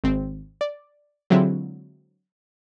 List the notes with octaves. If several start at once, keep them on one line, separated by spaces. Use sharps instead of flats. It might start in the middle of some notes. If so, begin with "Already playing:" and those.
G#1 C4
D5
D3 F#3 G#3 C4 E4 F4